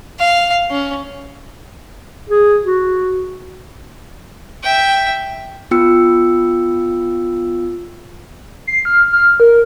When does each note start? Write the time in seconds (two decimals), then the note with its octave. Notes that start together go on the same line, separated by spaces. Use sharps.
0.20 F5
0.71 C#4
2.29 G#4
2.64 F#4
4.63 E5 G5
5.71 B3 F4 G5 E6 C#7
8.67 C7
8.85 F6
9.13 F6
9.40 A#4